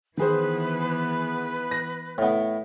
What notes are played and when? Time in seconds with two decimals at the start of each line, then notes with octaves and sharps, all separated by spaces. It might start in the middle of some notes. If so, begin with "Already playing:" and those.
0.17 D#3 E3 B3 G#4 B4 C5
1.71 A#6
2.18 A2 B3